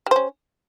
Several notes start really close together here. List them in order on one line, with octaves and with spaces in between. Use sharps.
G3 C5 C#4